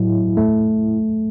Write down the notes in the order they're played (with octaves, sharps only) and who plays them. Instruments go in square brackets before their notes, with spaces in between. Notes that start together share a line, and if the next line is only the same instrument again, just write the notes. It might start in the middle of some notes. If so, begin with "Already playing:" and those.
Already playing: [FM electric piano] A2 E4 [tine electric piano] F#3
[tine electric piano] A3